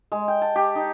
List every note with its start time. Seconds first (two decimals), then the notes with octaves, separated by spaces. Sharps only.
0.12 G#3
0.28 G5
0.42 A5
0.56 G4
0.76 D#4